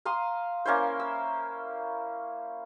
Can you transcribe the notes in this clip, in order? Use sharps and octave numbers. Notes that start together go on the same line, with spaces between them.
F5 A#5 C6 D#6
A#3 C#4 E4 C5
E6